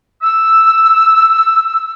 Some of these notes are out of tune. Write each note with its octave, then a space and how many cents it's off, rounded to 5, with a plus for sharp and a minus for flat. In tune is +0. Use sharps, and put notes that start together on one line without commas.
E6 +0